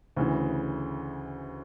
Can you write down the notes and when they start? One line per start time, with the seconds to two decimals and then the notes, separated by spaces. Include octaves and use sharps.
0.17 D2 C#3 E3